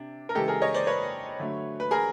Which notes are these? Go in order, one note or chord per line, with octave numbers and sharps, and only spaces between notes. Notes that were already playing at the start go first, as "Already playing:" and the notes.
Already playing: C3 D4
A#4
C#3 E3 G#3 G4 A4
G#4 A#4
C#5 D#5
C5 D5
B4 C#5
D3 F#3 A3
B4
G#4 A#4